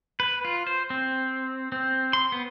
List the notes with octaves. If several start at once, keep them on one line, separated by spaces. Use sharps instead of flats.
B4
F4
C5
C4
C4
C6
B3